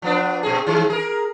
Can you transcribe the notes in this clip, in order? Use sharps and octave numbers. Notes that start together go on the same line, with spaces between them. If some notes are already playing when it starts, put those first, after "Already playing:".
F3 B3 D4
A#2 C4 G#4
D#3 G#3
G#4 A#4